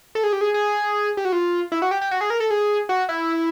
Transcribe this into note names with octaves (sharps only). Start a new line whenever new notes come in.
A4
G#4
G4
G#4
G#4
G4
F#4
F4
E4
F#4
G4
G4
F#4
G#4
A#4
A4
G#4
F#4
E4